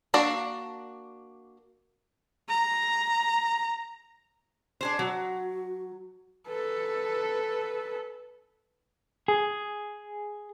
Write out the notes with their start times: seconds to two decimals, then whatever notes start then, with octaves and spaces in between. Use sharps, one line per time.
0.14 A#3 D4 F#4 D5
2.48 A#5
4.81 D4 G#4 C5
4.99 F#3 F#4
6.48 A4 B4
9.28 G#4